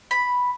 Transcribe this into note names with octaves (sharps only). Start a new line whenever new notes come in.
B5